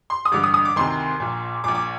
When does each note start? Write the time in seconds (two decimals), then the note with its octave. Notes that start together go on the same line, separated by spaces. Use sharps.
0.10 C6
0.25 D#6
0.32 A1 G2 D3 D6
0.43 D#6
0.54 D#6
0.65 D6
0.76 D2 C3 D#3 C6
1.20 A#1 A#2
1.64 A#2 D6
1.68 A#1
1.75 D6